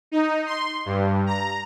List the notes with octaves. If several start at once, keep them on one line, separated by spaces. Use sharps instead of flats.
D#4
C6
G2
A#5